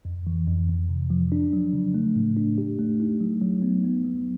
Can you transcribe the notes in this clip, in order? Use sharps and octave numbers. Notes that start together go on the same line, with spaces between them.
F2
E3
F2
F2
C3
F3
D4
F#3
C#3
A3
A2
D4
G4
A3
D#4
F#3
F#3
B3
B3
F#3